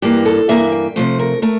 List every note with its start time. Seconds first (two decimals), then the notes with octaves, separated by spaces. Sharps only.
0.02 G2 E3 A#3 G4
0.25 A4
0.49 G2 E3 A#3 E5
0.72 G5
0.96 C3 F3 A3 C5
1.19 A#4
1.42 A3 A#4